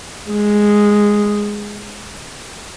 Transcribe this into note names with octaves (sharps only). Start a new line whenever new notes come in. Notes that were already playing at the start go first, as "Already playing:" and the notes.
G#3